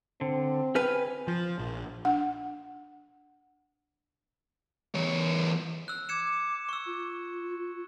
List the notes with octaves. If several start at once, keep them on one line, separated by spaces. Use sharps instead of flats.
D3 C4
B4 G5 G#5 F6
F3
A#1
D4 F#5
E2 C#5
E6 F#6
D6 G#6 C#7 E7
C#6 E6
F4